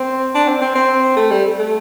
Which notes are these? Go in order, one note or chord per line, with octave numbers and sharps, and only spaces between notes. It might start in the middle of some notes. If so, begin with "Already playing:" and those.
Already playing: C4
D4
C4
C4
C4
A3
G3
A3